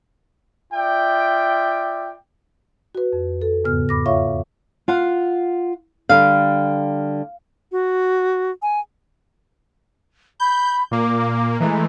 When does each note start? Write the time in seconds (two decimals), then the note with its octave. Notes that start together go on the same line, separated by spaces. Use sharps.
0.72 F4 D5 E5 G5
2.95 F#4 B4
3.13 F2
3.42 A4
3.64 E2 G#2 C#3 B3 F6
3.89 B5 D6 A#6
4.06 F4 C#5 E5 F5 C#6
4.88 F4 F5 F#5
6.09 D3 G3 F5
7.72 F#4
8.62 G#5
10.40 B5 G6
10.91 A#2 A#3 D6
11.60 E3 G#3 A3 A#5